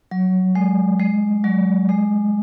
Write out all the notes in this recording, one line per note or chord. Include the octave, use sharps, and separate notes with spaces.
F#3
G#3
G#3
F#3
G#3